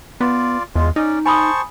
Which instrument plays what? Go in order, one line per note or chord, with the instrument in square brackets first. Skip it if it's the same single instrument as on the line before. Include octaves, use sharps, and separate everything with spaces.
[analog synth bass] B3 [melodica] F4 D5
[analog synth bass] E2 [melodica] G#3 F4
[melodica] C#4 D5 [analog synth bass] D#4
[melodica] C5 A5 C#6 [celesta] G#5 B5 D#6